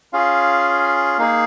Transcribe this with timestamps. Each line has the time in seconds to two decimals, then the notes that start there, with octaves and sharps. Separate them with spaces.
0.13 C#4 F4 G#4 F5
1.18 A#3 D#4 G#4 F5